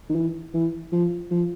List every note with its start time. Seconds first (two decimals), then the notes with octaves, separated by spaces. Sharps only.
0.09 D#3
0.15 E3
0.54 E3
0.92 F3
1.31 F3